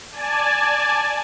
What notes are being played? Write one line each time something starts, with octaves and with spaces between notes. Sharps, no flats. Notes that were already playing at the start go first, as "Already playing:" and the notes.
D5 G#5 A5